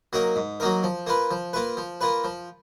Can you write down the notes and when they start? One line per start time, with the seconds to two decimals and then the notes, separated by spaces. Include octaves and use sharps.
0.13 F#3 A#3 D#4 A#4
0.36 G#2
0.60 F#3 A#3 D#4 A#4
0.83 F3
1.07 A#3 F4 B4
1.31 F3
1.53 A#3 F4 B4
1.77 F3
2.01 A#3 F4 B4
2.24 F3